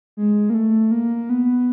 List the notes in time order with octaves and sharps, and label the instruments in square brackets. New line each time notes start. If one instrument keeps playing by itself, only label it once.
[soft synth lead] G#3
A#3
A3
A#3
B3